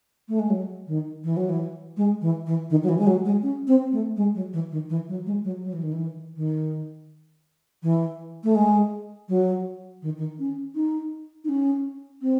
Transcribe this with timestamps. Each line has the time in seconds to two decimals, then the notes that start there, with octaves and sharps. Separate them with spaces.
0.29 A3
0.39 G#3
0.50 F#3
0.87 D#3
1.24 E3
1.37 F#3
1.49 E3
1.97 G#3
2.21 E3
2.46 E3
2.70 D#3
2.83 F#3
2.89 E3
2.99 G#3
3.07 F#3
3.25 G#3
3.43 C#4
3.68 C4
3.92 A3
4.17 G#3
4.35 F#3
4.53 E3
4.71 D#3
4.90 E3
5.09 F#3
5.26 G#3
5.44 F#3
5.63 F#3
5.73 E3
5.83 D#3
5.93 E3
6.36 D#3
7.83 E3
8.44 A3
8.55 G#3
9.29 F#3
10.02 D#3
10.17 D#3
10.39 C#4
10.75 D#4
11.44 D#4
11.49 C#4
12.22 C4